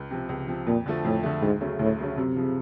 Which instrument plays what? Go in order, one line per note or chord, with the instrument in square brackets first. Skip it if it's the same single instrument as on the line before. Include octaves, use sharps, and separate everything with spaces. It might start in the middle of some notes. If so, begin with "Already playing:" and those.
Already playing: [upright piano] C#2
C3 F3
C#2
C3 F3
[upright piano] F2 [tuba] A#2
[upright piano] D3 F3 A3
[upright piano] F2 [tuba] A2
[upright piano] D3 F3 A3
[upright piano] D2 [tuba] G#2
[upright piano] C#3 F#3 A3 C#4
[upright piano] D2 [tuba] A2
[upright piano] C#3 F#3 A3 C#4
[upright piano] F#2 [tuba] C3
[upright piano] C#3 F3